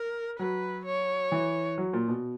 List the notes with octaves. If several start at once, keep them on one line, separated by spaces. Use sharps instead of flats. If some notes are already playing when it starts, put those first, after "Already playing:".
Already playing: A#4
F#3 B4
C#5
E3
F#3
A#2
B2